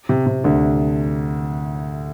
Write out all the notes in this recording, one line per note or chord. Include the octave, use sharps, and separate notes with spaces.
C3
C3
D2 D3